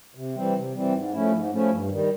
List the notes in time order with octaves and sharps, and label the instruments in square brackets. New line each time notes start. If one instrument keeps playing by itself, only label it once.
[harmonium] C3
E3 G3 C4
C3
E3 G3 C4
G#2
F3 A3 C#4 E4
G#2
F3 A3 C#4 E4
G2
D#3 G3